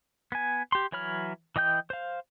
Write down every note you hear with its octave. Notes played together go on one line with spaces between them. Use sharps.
B3 G#5
G4 C6
E3 F#3 C#5 B5 F6
E3 D#5 G5 G6
C5 F5